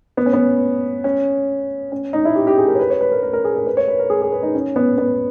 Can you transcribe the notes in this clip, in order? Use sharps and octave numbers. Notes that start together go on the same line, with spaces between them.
B3
C#4
B3
C#4
C#4
D#4
E4
G4
G4
G#4
A#4
C#5
B4
C#5
B4
A#4
A#4
A#4
G#4
A#4
B4
C#5
B4
A#4
G#4
G#4
B4
D#4
C#4
B3
B3